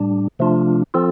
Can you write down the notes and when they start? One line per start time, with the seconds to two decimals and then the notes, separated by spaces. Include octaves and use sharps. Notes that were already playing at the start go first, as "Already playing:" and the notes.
Already playing: A2 G3 D4
0.39 C3 F3 A3 D4 F4
0.94 F3 C4 F4 A4